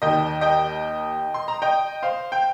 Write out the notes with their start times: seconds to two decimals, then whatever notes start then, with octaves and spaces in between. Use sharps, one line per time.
0.02 D#2 D#3 D#5 G5
0.41 D#5 G5
1.34 C6
1.48 A#5
1.62 D#5 G5
2.03 C5 F5
2.32 G5